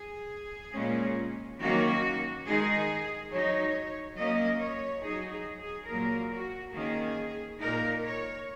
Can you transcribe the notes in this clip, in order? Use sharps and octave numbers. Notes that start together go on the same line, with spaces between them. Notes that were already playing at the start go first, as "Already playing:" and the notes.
Already playing: G#4
A#2 G#3 C#4
D#3 F#3 A#3 C#4 F#4
D#3 G#3 D#4 G#4
F#3 D#4 C#5
F#3 A#3 C#4 D#5
C#5
F#3 D#4 G#4
G#4
G#4
A#2 F#3 A#3 A#4
F#4
D#3 A#3 C#4 G#4
A#2 A#3 D#4 A#4
C#5